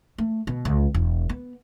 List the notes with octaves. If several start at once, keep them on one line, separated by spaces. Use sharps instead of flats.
A3
B2
C#2
E1
B3